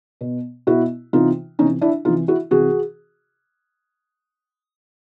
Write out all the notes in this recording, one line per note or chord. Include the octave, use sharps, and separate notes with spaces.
B2
B2 E4 F#4
C3 E3 D#4 F4
C3 E3 C#4 D#4
D4 E4
C3 E3 D#4 F4
E4 F#4
C3 E3 F#4 G#4